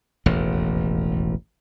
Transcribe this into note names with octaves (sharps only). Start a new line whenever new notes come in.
E1 A1 D#2